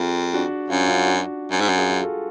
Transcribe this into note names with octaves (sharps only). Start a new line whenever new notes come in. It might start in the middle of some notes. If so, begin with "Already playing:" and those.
Already playing: F2 F4 G#4
D4 F#4
F#2 C#4 F4
C#4 F4
D4 F#4
F#2
G#2
F#2
F4 G#4
F4 G#4
F#4 A4